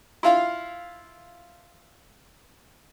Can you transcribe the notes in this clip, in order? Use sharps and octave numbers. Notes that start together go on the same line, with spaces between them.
E4 F4 F5